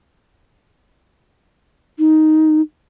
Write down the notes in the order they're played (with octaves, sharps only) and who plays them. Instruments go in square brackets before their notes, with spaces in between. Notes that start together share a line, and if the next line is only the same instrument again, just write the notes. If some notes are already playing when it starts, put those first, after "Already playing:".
[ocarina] D#4